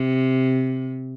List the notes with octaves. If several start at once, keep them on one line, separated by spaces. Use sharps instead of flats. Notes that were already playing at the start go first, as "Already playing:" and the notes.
Already playing: C3